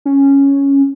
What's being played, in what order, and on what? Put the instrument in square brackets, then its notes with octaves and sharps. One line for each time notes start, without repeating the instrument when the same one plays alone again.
[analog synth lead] C#4